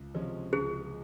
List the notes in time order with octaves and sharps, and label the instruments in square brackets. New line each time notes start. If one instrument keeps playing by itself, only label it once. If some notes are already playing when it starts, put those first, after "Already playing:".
Already playing: [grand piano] C#2
C3 F3 G#3 C#4
[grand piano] C#2 [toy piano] G#4